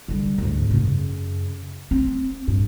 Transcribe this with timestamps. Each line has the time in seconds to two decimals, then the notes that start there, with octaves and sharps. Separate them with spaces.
0.08 D3 G3
0.38 D2 G#2
0.71 F#2 C#3
1.91 C4
2.48 A1 G2